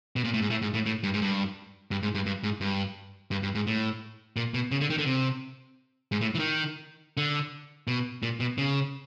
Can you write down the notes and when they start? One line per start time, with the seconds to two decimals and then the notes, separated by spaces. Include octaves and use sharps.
0.16 B2
0.24 A#2
0.34 A2
0.42 G#2
0.50 A2
0.62 G#2
0.74 A2
0.86 A2
1.03 G2
1.14 G#2
1.21 G2
1.91 G2
2.03 G#2
2.15 G2
2.26 G2
2.43 G#2
2.61 G2
3.31 G2
3.43 G2
3.55 G#2
3.67 A2
4.36 A#2
4.54 B2
4.71 C#3
4.81 D3
4.90 D#3
4.98 D3
5.06 C3
6.12 G#2
6.21 A2
6.35 E3
6.39 D#3
7.17 D3
7.87 B2
8.23 A#2
8.40 B2
8.58 C#3